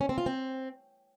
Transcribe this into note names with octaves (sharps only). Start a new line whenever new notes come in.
C#4
C4
F4
C4